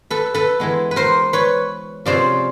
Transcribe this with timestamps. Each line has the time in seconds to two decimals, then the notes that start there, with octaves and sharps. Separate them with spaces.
0.10 A4 B4
0.34 A4 B4
0.60 E3 G#3 B3
0.91 B4
0.96 A#4 C5
1.33 B4 C#5
2.06 C3 F3 G#3 C#4 C5 D5